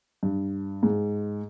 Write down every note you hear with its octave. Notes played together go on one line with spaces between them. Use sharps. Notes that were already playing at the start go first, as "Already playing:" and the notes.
G2
G#2